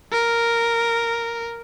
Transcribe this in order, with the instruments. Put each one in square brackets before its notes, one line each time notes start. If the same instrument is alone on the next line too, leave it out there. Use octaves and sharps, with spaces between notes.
[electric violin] A#4